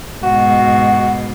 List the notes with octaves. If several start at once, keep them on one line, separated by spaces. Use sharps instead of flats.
G#2 B2 F#4